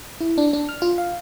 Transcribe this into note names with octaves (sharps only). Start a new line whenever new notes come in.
E4
D4
D4
F6
F4
F5